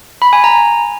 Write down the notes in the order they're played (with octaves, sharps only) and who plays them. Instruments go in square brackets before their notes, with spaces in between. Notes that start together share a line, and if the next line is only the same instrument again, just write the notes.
[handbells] B5
G#5
A#5